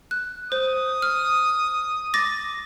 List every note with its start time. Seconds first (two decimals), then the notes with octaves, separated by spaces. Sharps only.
0.11 F#6
0.52 C5 D#6
1.02 F6
2.14 D6 A6 A#6